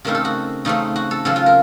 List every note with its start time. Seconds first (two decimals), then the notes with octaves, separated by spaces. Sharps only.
0.05 C#3 A3 C4 D#4 A#4
0.15 A4
0.25 F#4
0.65 C#3 A3 C4 D#4
0.96 F#4
1.11 A4
1.25 C#3 F#3 C4 A4
1.36 F4
1.46 A#4